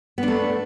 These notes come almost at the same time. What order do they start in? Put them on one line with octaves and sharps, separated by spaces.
B3 D4 A3